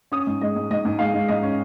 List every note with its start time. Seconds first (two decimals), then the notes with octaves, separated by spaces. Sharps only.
0.12 C#4 D#6
0.27 G#2
0.41 G#3 D#5
0.56 G#2
0.71 G#2 D#5
0.85 G#2
0.99 G#3 F5
1.14 G#3
1.28 G#2 D#5
1.43 C#4